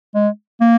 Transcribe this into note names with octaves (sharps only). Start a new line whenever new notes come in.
G#3
A#3